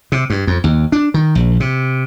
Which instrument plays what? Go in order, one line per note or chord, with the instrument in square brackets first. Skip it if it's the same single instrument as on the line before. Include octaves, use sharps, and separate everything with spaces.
[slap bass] C3
G2
F2
D#2
D4
D#3
A#1
C3